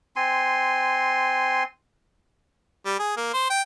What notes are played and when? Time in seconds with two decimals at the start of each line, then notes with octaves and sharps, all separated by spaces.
0.16 C4 G#5 C6
2.86 G3
2.99 G#4
3.17 A#3
3.33 C5
3.50 G5